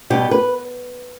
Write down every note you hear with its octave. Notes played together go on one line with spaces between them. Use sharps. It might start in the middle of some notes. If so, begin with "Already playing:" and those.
B2 G3 G4
B4